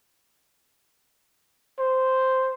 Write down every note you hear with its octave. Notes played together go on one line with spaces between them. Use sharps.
C5